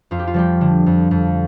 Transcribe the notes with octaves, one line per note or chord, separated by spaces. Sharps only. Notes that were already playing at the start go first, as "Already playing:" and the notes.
F2 F4
G4
F4
F3 G3 G4
D3
F2
F2